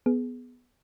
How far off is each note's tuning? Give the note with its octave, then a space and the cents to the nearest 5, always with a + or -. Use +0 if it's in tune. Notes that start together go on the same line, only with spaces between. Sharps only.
B3 +0 G#4 +15